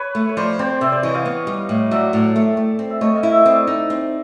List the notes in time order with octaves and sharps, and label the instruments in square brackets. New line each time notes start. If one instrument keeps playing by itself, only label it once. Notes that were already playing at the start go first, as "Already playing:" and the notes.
Already playing: [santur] B4 C#5
[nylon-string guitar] A3
[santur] C#5
[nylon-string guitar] F3 [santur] C5 D5
[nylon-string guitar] C4 [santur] C5 D5
[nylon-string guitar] C3 [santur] D5 E5
[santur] C5 D5
[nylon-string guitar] E3 [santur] C#5 D#5
[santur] D#5 F5
[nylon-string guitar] B3
G3
A2
[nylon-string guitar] F#3 [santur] D5 E5
[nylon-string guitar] A2
A3
A3
C4
[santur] E5
[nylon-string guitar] A3 [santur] C#5 D#5
[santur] D#5 F5
[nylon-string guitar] E4
[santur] E5
[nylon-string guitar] C4 [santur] D#5
[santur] D5 E5
[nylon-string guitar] D#4
C4